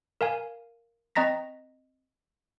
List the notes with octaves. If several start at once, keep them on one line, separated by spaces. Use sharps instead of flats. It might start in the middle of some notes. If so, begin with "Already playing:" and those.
A#4 F5 G#5
C4 D#5 A#5 A#6 B6